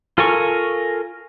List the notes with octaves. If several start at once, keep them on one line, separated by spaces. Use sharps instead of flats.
F4 A4 A#4 G#5 C#6